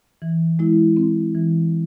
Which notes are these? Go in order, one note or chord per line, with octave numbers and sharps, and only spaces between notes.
E3
G#3 E4
C4
E3